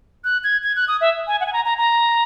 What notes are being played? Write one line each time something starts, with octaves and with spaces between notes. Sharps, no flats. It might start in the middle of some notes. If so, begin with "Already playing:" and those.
F#6
G#6
G#6
F#6
D#6
E5
G#5
F#5
G#5
A#5
A#5
A#5